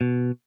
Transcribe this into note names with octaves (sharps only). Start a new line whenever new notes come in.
B2